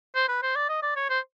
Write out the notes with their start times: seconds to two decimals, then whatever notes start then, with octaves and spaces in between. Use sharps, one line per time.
0.15 C5
0.28 B4
0.43 C5
0.56 D5
0.69 D#5
0.83 D5
0.96 C#5
1.10 C5